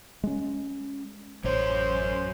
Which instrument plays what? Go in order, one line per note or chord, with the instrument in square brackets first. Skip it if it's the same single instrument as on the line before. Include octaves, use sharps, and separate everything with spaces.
[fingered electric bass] G#3 C#4
[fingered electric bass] A1 [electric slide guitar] F#2 C#5 [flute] C5